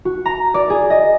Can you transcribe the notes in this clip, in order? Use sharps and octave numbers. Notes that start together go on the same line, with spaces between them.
F#4
A#5
D5
G#4
D#5